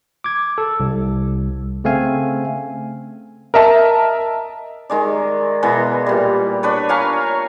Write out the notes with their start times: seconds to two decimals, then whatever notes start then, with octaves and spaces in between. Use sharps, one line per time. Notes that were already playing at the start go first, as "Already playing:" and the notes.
0.24 D6 G#6
0.58 A4
0.80 C2
1.84 C#3 A3 C4 F5 G#5
3.54 A#4 D#5 E5 A5
4.90 D#3 G#3 D5
5.63 B2 E3 G#3
6.06 A#2 G3
6.63 D4 B4 C#5
6.89 C#5 F5 G#5 A#5